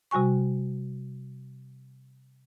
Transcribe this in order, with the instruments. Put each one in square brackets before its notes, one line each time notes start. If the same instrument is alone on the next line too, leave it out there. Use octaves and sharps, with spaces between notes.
[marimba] C3 G3 F#4 G#5 C#6